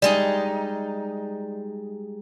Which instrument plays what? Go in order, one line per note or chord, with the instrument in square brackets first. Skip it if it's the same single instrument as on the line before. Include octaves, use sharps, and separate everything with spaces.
[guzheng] G3 G#3 D#4 [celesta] D5